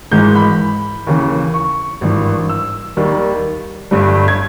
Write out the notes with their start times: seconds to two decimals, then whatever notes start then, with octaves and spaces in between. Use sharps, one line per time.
0.11 G#1 G#2 E3 G#3 G6
0.36 B5
1.07 D#2 C#3 E3
1.54 C#6
2.01 G#1 G2 E3
2.49 E6
2.97 D#2 D#3 G3
3.91 G1 G2 G3
4.28 G#6